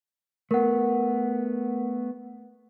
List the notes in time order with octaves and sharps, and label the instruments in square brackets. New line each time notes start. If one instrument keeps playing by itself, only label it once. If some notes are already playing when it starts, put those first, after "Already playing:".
[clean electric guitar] A3 B3 [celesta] A#4 F#5